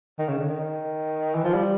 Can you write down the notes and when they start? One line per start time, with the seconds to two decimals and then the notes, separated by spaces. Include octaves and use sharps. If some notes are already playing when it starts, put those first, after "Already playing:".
0.19 D#3
0.29 C#3
0.38 D3
0.48 D#3
1.35 E3
1.44 F3
1.54 G3